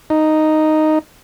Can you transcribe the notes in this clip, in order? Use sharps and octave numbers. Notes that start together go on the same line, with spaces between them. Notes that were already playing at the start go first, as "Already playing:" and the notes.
D#4